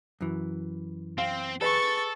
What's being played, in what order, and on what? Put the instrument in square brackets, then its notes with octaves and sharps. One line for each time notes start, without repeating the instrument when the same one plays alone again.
[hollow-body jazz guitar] F#2 E3
[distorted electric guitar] C4 [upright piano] F5
[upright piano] G#4 B4 [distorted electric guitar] A4 [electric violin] C#6 A6